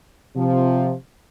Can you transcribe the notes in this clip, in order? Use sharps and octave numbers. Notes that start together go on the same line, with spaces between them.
C3 F3